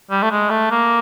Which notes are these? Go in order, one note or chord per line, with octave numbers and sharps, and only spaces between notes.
G3
A3
G#3
A3
A#3